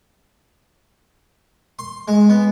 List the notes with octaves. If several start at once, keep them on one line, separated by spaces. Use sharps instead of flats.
C6
G#3
B3